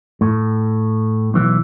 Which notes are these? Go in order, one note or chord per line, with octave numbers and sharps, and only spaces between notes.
A2
B1 E3